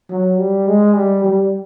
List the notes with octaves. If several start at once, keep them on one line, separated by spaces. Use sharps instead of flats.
F#3
G3
G#3
G3
G3